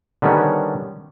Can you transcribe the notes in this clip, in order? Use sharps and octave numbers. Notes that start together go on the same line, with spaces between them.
D3 D#3 G3 B3 C#4